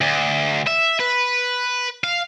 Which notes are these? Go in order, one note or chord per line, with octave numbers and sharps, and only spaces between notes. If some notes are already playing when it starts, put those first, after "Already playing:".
D2
E5
B4
F5